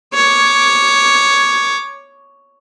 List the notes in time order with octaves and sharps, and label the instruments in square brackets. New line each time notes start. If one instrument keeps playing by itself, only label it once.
[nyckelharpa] C#5 D6